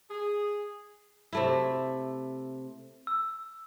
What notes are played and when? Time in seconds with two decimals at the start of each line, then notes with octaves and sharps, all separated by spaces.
0.11 G#4
1.33 C3 A3 E4
3.07 E6